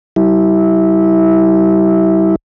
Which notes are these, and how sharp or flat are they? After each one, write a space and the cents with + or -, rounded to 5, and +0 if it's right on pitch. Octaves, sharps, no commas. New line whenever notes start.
G3 -35 E4 -20